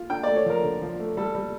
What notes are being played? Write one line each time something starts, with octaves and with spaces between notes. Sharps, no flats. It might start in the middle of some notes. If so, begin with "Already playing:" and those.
Already playing: F4
D4 G5
A3 D5
C#5
F3 A#4
D3
F3
A3
G3 A4
G3